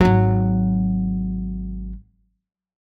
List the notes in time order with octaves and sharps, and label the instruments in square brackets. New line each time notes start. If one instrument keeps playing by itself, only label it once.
[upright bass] G#1 F#3